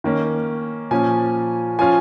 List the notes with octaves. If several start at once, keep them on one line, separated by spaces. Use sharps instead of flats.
D#3 A#3 C#4
A#2 F3 C#4 G#5
F3 C#4 F4 G#5